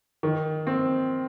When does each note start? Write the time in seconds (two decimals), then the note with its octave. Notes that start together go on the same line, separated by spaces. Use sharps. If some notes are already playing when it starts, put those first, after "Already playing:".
0.23 D#3
0.67 C4